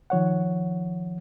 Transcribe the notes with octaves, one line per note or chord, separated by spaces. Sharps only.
D#3 F3 C#5 F#5